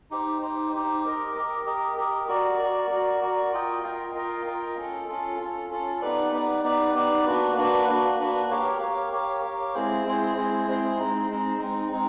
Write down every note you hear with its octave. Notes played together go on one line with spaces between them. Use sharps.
D#4 G4 C5
D#4 G4 C5
D#4 G4 C5
G4 A#4 D#5
G4 A#4 D#5
G4 A#4 D#5
G4 A#4 D#5
F#4 A#4 D5
F#4 A#4 D5
F#4 A#4 D5
F#4 A#4 D5
F4 A#4 D#5 G5
F4 A#4 D#5 G5
F4 A#4 D#5 G5
F4 A#4 D#5 G5
C#4 F4 A4
C#4 F4 A4
C#4 F4 A4
C#4 F4 A4
B3 D#4 G4 B4 D5
B3 D#4 G4 B4 D5
B3 D#4 G4 B4 D5
B3 D#4 G4 B4 D5
A#3 D4 F#4 B4
A#3 D4 F#4 B4
A#3 D4 F#4 B4
A#3 D4 F#4 B4
G4 A#4 C#5 F5
G4 A#4 C#5 F5
G4 A#4 C#5 F5
G4 A#4 C#5 F5
G#3 C4 E4 G#4 C5
G#3 C4 E4 G#4 C5
G#3 C4 E4 G#4 C5
G#3 C4 E4 G#4 C5
G#3 C4 D#4
G#3 C4 D#4
G#3 C4 D#4
G#3 C4 D#4